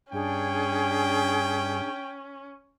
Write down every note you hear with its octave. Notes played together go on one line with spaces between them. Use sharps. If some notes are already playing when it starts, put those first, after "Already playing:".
G2 C#4 D4 G#4 G5